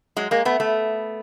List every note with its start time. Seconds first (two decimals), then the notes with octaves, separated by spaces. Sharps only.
0.17 F#3 G#3
0.31 G#3 A#3
0.45 A3 B3
0.60 A3 B3